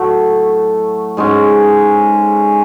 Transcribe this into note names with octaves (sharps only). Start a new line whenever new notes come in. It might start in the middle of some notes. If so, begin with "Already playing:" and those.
Already playing: A2 F#3 A3
G#2 G#3 C#4